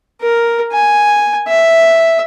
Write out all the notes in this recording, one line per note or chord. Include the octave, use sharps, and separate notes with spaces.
A#4
G#5
E5